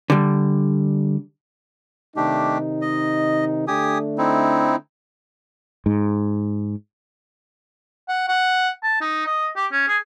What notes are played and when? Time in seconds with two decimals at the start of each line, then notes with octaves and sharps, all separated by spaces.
0.10 D3 G3
2.17 C3 D#3 A3 D4 D#4 G4
2.82 D#5
3.68 D3 A3 D4 G4 G#5 D#6
4.18 C4 D#4 E4
5.86 G#2
8.08 F#5
8.28 F#5
8.83 A5
9.01 D#4
9.27 D#5
9.56 G4
9.72 C#4
9.88 G#4